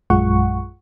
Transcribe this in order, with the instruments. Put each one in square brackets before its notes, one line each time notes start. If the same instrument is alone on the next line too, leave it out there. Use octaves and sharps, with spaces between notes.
[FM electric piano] A#1 F#2 G#3 F4 F#5 C#6